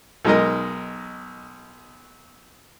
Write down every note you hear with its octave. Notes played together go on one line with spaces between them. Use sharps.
B1 G#3 D#4 A#4 D#5